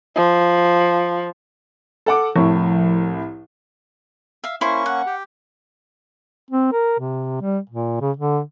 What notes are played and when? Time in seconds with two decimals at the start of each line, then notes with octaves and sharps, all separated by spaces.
0.16 F3
2.06 A4 F#5 D6
2.36 C2 A2 F3
4.44 E5 F5
4.61 A#3 C#4 E4 C5 C#6
4.86 F#5
5.06 G4
6.51 C4
6.72 A#4
6.99 C3
7.41 G3
7.69 A#2
8.00 C#3
8.17 D3